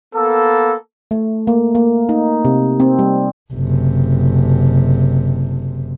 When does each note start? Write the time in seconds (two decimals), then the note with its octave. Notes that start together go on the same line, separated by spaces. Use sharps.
0.14 A#3 B3 A4
1.11 A3
1.47 A#3
1.75 A#3
2.09 D#4
2.45 C3
2.80 C4
2.99 G3
3.53 F#1 C3